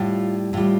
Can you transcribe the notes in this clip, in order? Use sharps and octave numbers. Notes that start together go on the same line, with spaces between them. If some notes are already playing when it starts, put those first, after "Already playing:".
Already playing: A2 G3 F4
A2 G3 F4